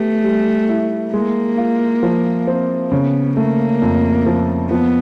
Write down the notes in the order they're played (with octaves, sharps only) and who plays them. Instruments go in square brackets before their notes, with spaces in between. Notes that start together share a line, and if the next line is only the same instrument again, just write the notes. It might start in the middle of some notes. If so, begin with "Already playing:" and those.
Already playing: [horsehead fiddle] A3 [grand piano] B3 G4
[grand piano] G3
E4
[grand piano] G#3 [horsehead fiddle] A#3
[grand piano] F4
F3
C4
[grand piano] C#3 [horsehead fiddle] B3
[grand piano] A3 [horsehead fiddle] A#3
[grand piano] F2
F3
[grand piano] F3 [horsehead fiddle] B3